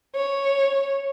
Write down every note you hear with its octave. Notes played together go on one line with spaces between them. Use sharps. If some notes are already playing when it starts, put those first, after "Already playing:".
C#5